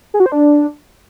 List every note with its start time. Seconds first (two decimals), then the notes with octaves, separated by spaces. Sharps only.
0.14 G#4
0.20 F#4
0.26 C5
0.32 D4